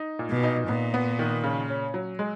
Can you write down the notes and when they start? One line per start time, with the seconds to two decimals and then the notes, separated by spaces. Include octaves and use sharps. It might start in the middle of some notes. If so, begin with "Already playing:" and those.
Already playing: D#4
0.19 A#2
0.31 B2
0.44 D#4
0.68 A#2 B3
0.94 B3
1.19 D#3
1.44 C#3
1.69 C#4
1.94 F#3
2.19 G#3